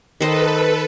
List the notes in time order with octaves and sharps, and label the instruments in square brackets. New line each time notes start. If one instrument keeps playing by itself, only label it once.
[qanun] D#3 C5 D#5 [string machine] A4 B4